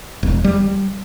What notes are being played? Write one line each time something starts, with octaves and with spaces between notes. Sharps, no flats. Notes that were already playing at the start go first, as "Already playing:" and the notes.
E1
G3